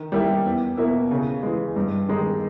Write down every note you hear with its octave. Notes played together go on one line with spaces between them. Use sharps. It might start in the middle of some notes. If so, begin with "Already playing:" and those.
Already playing: D#3
G3 A#3 E4 G4
E2
B2 A#3 E4
C#3
E3 G#3
G2
D#3 G#3 D#4